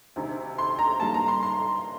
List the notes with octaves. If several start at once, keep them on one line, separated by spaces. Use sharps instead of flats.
D2 C3 D#3
C6
A#5
G2 D#3 G3 A#3 A5
A#5
C6
C6